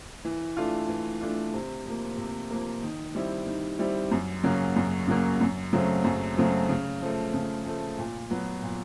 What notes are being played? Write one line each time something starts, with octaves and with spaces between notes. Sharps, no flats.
E3
A3 D4 F4
E3
A3 D4 F4
C3
F3 A#3
C3
F3 A#3
D#3
G3 C4 E4
D#3
G3 C4 E4
F#2
C#3 F#3 A#3 C#4
F#2
C#3 F#3 A#3 C#4
F#2
C#3 F#3 A3 C4
F#2
C#3 F#3 A3 C4
C#3
F3 A3
C#3
F3 A3
A#2
F#3 B3
A#2